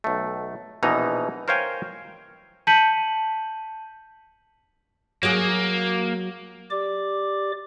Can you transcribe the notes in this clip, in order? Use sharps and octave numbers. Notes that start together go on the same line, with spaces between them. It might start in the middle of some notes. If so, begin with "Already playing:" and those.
B1 A3
A#1 B2 E3 D#4 A#5
A#4 C5 C#5 F5 G5 G#5
A5 G6 B6 C#7 D#7 F#7
F#3 A#3 G#4
G4 D5 D6